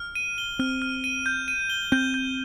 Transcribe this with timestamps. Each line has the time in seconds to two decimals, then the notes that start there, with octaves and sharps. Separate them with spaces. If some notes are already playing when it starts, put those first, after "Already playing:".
Already playing: F6
0.15 D#7
0.38 G7
0.59 C4 F6
0.82 F6
1.04 D#7
1.26 G6
1.48 D#7
1.70 G7
1.92 C4 G6
2.14 G6